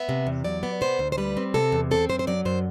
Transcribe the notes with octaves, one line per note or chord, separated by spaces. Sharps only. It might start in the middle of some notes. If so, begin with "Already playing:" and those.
Already playing: B3 E5
C3
E2
F#3 D5
B3
C3 C5
D2
C5
G3 B4
C4
C3 A4
E2
C4 A4
F#2 C5
C5
F#3 D5
F#2 C5